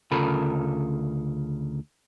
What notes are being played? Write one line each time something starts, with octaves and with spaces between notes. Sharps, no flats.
D2 C#3 F4 A4 A#4 B5